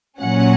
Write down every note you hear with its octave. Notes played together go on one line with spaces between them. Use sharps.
A#2 F#3 C#4 F#5